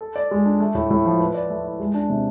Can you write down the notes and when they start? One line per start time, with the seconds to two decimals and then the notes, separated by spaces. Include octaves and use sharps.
0.01 A4
0.16 D5
0.31 G#3
0.46 D4
0.60 A3
0.75 A2
0.91 A2
1.05 F3
1.20 B4
1.34 D5
1.50 A3
1.65 E4
1.80 G#3
1.94 D4
2.10 C3